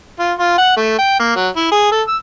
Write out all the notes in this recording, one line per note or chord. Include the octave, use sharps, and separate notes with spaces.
F4
F4
F#5
A3
G5
A#3
F#3
E4
G#4
A4
E6